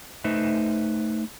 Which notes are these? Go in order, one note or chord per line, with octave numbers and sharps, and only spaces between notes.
A3 D#4 B4 C5 E5